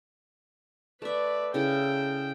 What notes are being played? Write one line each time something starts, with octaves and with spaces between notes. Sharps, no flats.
A3 B4 D5 E5
C#3 E4 A4 G5